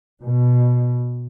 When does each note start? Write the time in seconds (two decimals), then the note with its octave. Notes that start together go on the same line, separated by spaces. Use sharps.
0.21 B2